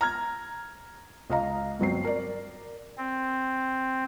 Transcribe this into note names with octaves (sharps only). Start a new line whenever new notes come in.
A#5 F6 G#6
C#2 D#5 F5 A#5
G1 F#3 C4 C7
A#4 D5
C4